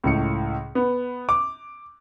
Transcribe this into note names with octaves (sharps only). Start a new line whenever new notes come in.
C#2 A2 C#7
B3
D6